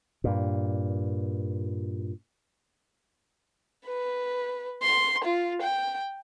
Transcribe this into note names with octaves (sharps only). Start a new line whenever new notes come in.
G2 A#2
B4
C6
F4
G5